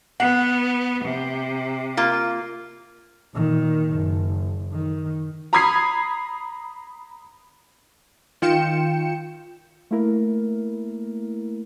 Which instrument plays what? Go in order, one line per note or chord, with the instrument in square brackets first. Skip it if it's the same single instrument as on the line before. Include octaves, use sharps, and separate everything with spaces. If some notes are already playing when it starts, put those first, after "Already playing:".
[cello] B3 [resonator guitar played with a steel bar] F#5
[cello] C3
[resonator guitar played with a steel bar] A#3 F4
[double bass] A#2 D#3
F#1
D#3
[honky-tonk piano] A#5 B5 D#6 G#6 B6 C7
[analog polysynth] D#3 F4 G5 C#7 E7
[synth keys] A3 A#3 E4 A#4